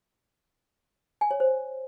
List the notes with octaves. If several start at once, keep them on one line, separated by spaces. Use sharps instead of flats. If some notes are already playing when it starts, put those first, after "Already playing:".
G#5
C#5
C5